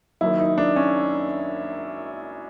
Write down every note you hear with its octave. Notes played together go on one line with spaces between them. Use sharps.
F#1 F#2 D#3 E4
D#4
D4
C#4